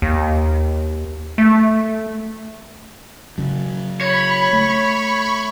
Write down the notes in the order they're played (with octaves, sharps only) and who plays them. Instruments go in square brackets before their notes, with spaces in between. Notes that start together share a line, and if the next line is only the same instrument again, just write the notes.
[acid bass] D#2
A3
[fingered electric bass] C#3 F#3
[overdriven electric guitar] C#5 [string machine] B5
[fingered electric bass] A3 [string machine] B5 C#6